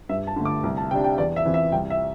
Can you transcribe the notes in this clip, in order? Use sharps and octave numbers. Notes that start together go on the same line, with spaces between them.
G2 E5
A5
D3 A3
D6
C2
A5
C3 G3 D4 G5
G5
E2 D5
E5
E3 C4
E5
C2 G5
E5